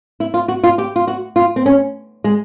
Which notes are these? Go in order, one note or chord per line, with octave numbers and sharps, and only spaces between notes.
E4
F4
F#4
F4
G4
F4
F#4
F4
C4
C#4
G#3